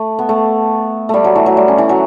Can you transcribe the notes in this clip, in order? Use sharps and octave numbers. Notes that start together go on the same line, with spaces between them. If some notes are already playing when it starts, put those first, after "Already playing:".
Already playing: A3
B3
A3
G3 A3
F#3
E3
F#3
G3
C#4
E3
F#3